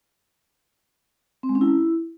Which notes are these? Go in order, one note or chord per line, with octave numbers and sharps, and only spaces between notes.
C4
G#3
C#4
E4